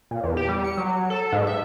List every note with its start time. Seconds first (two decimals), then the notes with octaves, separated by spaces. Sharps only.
0.11 A#2
0.23 E2
0.37 G4
0.49 G3
0.64 C#7
0.77 F#3
1.10 A4
1.32 G#2
1.47 E5